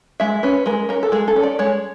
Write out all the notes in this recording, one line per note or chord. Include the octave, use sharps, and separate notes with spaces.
G#3 E5
C#4 B4
G#3 A#4
C#4 A#4
A4
G#3 G#4
A4
C#4
D5
G#3 C#5